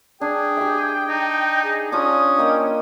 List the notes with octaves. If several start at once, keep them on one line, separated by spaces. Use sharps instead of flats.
D4 G#4 G5
G4 E5
D#4
G#4
C#4 D4 F4 G#5 D#6
A#3 D#5 G5